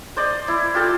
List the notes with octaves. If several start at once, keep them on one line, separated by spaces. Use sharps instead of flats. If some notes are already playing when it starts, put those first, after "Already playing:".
C5 D5 D#5
E4
F4 G4 A4